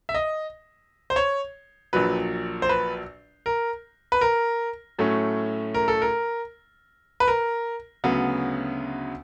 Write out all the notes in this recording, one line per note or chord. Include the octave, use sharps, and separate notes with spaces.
E5
D#5
C5
C#5
A#1 A#2 F#3 B4
C5
B4
A#4
B4
A#4
A2 F#3 A3 C#4
A#4
A4
A#4
B4
A#4
D2 C#3 F#3 B3